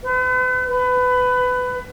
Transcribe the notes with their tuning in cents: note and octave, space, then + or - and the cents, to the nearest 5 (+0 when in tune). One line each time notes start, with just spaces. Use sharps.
B4 +45
B4 +20